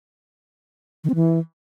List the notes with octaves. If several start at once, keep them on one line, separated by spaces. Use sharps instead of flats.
D#3
C4
E3